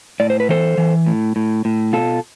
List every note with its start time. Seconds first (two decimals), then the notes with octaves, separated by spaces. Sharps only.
0.20 A2 D5
0.30 C5
0.40 B4
0.49 E3 A4 C5
0.78 E3
1.06 A2
1.36 A2
1.65 A2
1.93 B2 F4 A4